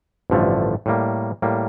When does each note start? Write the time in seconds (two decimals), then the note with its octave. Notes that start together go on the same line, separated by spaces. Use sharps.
0.30 A1 G2 D3 F3 A3
0.86 A2 G3 A#3
1.42 A2 G3 A#3